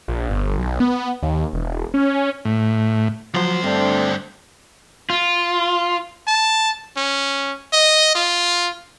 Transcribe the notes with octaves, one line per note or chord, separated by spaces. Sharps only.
A#1
G1
B1
B3
D#2
E1
C#4
A2
D2 F3 F#3 C5
G2 A3 C4 D4
F4
A5
C#4
D#5
F4